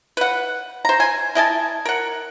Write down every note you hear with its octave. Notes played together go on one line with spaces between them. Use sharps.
B4 F#5
C5 A#5
G#5
E4 D#5 G#5 A5
A#4 F#5